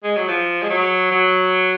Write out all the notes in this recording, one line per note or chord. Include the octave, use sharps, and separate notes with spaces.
G#3
F#3
F3
G#3
F#3
F#3